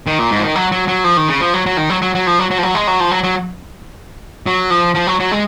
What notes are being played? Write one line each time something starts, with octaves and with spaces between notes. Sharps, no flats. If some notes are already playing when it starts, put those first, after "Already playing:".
D#3
A#2
G#2
F3
D#3
F#3
F#3
F#3
F3
D#3
C#3
F3
F#3
F#3
D#3
F#3
F#3
F#3
F3
F#3
F#3
F3
F#3
G#3
F#3
F3
F#3
F#3
F#3
F3
F3
F#3
F#3
G#3